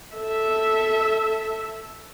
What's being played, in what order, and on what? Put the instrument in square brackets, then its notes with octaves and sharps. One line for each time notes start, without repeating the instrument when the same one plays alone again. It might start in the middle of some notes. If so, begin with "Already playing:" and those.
[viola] A4 E5